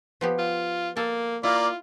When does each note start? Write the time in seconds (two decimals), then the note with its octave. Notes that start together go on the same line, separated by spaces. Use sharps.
0.21 F3 B3 G4
0.38 F4
0.97 A#3 A4
1.43 A#3 E4 F4 D5